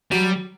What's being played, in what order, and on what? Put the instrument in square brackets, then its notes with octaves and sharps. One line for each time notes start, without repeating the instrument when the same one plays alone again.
[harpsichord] F#3 [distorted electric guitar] G3